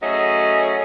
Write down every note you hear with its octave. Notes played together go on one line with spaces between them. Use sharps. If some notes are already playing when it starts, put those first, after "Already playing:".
F#3 A3 C#4 G#4 D#5